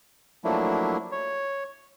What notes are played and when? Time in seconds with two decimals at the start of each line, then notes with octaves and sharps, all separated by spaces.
0.44 F3 F#3 A3 A#3 D4 E4
1.12 C#5